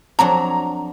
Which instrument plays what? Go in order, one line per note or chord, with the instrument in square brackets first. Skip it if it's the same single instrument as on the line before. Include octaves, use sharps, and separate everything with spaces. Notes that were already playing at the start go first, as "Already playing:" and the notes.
[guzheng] F2 F#3 D4 [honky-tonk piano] A#5